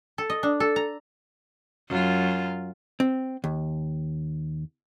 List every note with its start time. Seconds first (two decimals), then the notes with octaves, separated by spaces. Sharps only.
0.18 A4
0.30 D#5
0.43 D4
0.60 A4
0.76 A#5
1.89 F#2 F4
3.00 C4
3.44 D#2